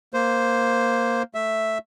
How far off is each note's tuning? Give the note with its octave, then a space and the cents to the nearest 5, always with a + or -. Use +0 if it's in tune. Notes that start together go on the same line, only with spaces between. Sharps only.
A#3 +0 C5 +0
A3 +0 E5 +0